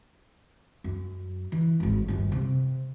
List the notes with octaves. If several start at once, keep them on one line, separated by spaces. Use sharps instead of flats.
F#2
E3
G#1 F#2
G1 D#2
C3